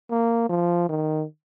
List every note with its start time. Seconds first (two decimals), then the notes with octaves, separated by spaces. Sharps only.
0.11 A#3
0.50 F3
0.89 D#3